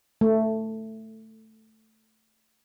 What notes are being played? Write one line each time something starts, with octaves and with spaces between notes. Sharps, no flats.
A3